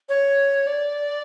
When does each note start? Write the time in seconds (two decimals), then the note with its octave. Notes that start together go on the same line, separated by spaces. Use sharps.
0.09 C#5
0.67 D5